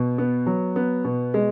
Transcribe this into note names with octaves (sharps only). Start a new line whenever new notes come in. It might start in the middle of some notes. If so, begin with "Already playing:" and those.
Already playing: B2
B3
F#3
B3
B2
G#3